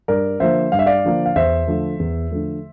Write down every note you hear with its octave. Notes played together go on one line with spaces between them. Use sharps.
G2 A#4 D5
D3 F3 A#3 C5 E5
G2 F5
E5
D5 F5
D3 F3 A#3
F5
E2 C5 E5
D3 F3 A3
E2
D3 F3 A3